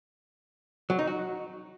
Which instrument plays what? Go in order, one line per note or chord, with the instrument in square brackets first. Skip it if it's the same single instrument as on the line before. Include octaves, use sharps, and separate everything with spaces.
[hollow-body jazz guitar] F#3
D#4
F#4